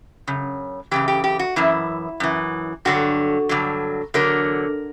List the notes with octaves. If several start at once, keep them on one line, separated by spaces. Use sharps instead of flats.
F#2 C#3
F#2 C#3 E3 G4
G4
G4
F#4
F#2 E3 E4
F#2 E3
G2 D3 F#3 F#4
G2 D3 F#3
E2 D3 F#3 A#4